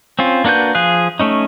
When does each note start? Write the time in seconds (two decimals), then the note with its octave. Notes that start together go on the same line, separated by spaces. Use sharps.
0.19 C4 C#4 F4
0.45 A#3 D4 F#4 B4 G6
0.75 F3 G#4 F5 F#6
1.20 A3 C#4 D#4